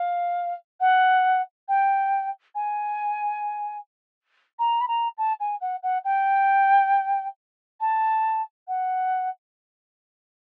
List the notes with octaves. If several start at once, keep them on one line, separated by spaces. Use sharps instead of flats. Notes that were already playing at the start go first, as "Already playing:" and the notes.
Already playing: F5
F#5
G5
G#5
A#5
B5
A#5
A5
G#5
F#5
F#5
G5
A5
F#5